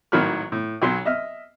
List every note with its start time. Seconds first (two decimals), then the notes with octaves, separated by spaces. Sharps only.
0.12 G#1 A2 D#3 F#3 B5 F6
0.52 A2
0.82 B1 F#3 C6
1.05 D#5 E5 F6